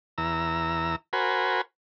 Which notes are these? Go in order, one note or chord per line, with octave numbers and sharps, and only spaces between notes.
E2 A#5 E6
F#4 A#4 C5 G#5 B5